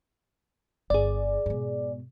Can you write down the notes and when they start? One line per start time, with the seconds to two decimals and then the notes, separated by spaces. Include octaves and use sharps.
0.90 G1 G#4 D5
1.46 G#2 B2